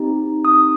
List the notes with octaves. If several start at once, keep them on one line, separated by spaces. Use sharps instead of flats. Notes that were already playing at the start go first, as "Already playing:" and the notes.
Already playing: C4 D#4 G4
D#6